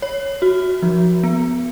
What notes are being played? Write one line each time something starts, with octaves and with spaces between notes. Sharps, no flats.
C#5
F#4
F3
B3